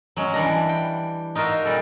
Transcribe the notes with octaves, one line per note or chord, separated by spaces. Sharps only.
F#3 G#3 C#4
E3 G3 D4 A#5
G5
D#4 F4 F#4 A#4 E5
A#2 G3 A4